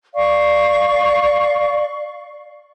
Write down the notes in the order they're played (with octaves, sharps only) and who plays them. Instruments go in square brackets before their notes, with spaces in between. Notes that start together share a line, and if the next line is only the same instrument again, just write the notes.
[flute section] D5 F5 C#6